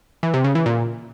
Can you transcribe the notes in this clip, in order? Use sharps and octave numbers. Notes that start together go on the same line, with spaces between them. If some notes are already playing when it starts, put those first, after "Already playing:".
E3
C3
C#3
E3
A#2